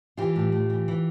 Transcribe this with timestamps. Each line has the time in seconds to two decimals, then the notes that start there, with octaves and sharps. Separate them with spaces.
0.17 E3 F4 G4
0.36 A2
0.52 A2
0.70 E3
0.88 E3